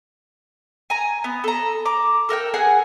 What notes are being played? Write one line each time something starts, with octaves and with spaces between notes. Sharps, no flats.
G#5 A#5
B3
A4 A#5
A#5 D6
A4 A#4 F#5 G5
G#4 F#5 G#5